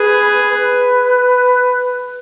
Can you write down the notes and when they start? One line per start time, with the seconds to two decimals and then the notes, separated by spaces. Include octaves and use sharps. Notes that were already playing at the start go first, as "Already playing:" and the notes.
Already playing: G#4 B4
0.54 B4